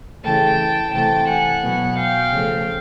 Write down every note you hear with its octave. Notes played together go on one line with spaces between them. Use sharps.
C#3 E3 A3 G5 A5
C3 E3 A3 G5 A5
F#5 G#5
B2 F#3 B3
F5 G5
C#3 F3 A3